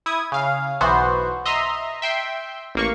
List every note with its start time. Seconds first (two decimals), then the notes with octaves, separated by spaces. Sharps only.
0.06 E4 D#6 G#6
0.32 C#3 F5
0.81 B1 E3 B3 F#4 C5
1.45 D#5 E5 A#5 C6
2.02 E5 G5 C6
2.75 A1 A#3 C#6